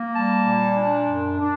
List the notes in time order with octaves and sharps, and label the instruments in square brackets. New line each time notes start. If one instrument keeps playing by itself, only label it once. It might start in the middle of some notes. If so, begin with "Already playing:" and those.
Already playing: [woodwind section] A#3
G3 A5
A#2
D4
F#2
D4